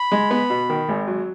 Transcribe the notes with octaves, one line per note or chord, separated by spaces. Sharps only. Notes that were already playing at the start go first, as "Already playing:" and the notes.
Already playing: B5
G#3
B3
B2
D#3
G#1
F#3